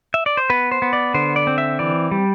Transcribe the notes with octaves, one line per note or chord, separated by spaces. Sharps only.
E5
D5
C5
B3 B4
C5
B3
D5
D3 C5
D5
C4
E5
E3 D5
G3